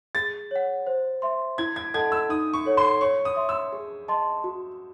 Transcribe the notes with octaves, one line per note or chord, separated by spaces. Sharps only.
G#4 A6
C#5 F#5
C5
E5 C6
E4 G#6
G#6
A4 D#5 F#5 A5 G#6
E6
D#4 D#6
C#6
A4 C#5 F#5
C6
C#5 C#6
D#6
E5 C6
E6
G#4
D#5 A5 C6
F#4